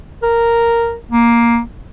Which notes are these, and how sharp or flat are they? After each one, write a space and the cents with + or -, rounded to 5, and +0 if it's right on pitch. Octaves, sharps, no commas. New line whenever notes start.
A#4 -5
A#3 +10